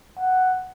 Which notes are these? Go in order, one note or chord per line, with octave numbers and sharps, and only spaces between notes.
F#5